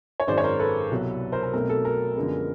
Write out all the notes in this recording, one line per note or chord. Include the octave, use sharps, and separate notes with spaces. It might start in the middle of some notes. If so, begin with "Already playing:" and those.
C#5
G#1 F#2 D#3 G#3 C5 D5
C#5
A#4 C5
A4 B4
C2 B2 F#3
A#4 C5
A#4
B1 B2 F#3 A3 C4 A#4
A4
A#4
F#2 D3 F3 G#3 B3